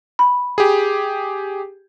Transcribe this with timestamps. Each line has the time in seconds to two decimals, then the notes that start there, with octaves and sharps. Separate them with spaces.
0.19 B5
0.58 G4 G#4